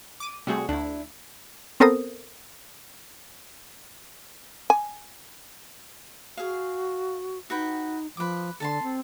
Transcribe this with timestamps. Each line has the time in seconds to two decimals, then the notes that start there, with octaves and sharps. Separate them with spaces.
0.20 D6 D#7
0.47 C3 G3 A3 C4 F#4 G#4
0.69 D2 D4 E4
1.80 B3 C4 A4 A#4 C5 D#6
4.70 G#5
6.37 F#4 G#4 F5
7.50 D#4 F#4 B4 G5
8.17 F3 B4 D6
8.60 D3 A4 A5 C6
8.83 C4